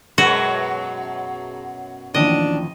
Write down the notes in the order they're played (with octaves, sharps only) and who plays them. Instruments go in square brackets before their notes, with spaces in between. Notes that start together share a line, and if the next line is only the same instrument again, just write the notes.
[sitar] F#2 B2 F#3 [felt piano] G#3 A#4 [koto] F#4
[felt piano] A1 D#2 F3 [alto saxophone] D4 [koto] D#5